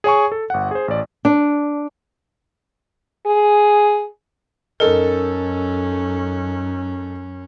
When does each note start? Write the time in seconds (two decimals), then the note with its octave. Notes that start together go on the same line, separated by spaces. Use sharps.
0.04 G#4 C#5 G#5 C#6
0.32 A4
0.50 G1 F#5
0.71 G#4 C5
0.88 A1 D5
1.25 D4
3.27 G#4
4.80 F#2 C#4 D#4 A4 A#4